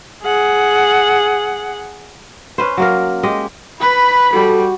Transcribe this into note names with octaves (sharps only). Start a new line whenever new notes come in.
G#4 F#5
C#4 B4 C5
F#3 A#3 A#4
G#3 G4 D#5
B4 B5
G3 F#4 A4